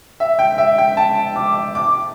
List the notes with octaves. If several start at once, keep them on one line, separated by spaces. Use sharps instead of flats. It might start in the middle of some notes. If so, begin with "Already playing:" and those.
E5
G5
E5
G5
A5
D6
D6